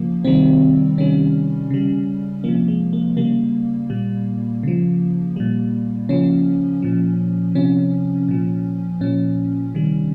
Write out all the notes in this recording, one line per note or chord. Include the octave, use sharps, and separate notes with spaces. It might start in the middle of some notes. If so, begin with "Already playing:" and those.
Already playing: C#3 F3 A#3
C3 D#3 G3 C4
C3 D#3 G3 C#4
C#3 G3
C3 F3 A#3
G#3
A#3
C#3 G3 A#3
A#2 G3
C#3 F3
A#2 G3
C#3 F3 C#4
A#2 F3
C3 F3 C#4
A#2 F3
A#2 F3 C#4
C3 D#3 G3